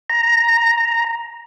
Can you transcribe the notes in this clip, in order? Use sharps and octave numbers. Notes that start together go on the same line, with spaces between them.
A#5